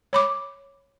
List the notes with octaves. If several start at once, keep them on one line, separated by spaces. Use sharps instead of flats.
C#5 B5 D6